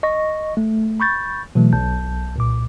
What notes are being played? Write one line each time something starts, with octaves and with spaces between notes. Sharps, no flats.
D#5 C#6 A#6
A3
B5 C#6 G6 A6
B2 E3 F#3 A3
B1 A5 G6
C2 A#2 D6